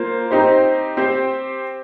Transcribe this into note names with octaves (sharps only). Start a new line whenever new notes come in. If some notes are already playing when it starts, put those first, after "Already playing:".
Already playing: A#3 F4 C5
C4 D#4 G4 C5
C4 G4 C5